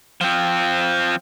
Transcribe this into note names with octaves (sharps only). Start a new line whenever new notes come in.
F3 C4